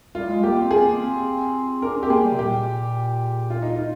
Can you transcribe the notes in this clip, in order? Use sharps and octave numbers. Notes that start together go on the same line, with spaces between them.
G3 F4
G#3
A#3 G4
C4
C4 G#4
A#3
C4
D4 A#4
C4
G4
A#3 G#4
G3
C3
A#2 G4
F4
D#4
F4